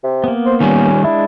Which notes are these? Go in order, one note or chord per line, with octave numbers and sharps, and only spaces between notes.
C3
A#3 B3
C5
D#3 G3 C#4
G#3 D4 E4